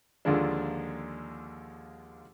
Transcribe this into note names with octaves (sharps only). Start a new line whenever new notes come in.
D#2 D3 F3 G#3 A#3 D4